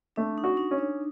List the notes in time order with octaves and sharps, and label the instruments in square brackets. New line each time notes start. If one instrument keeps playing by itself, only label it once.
[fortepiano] A3 [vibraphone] D4
[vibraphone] D#4
[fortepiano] F#4
[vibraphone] D#4
[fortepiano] C#4
[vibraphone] D4